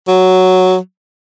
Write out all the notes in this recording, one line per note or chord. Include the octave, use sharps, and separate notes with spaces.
F#3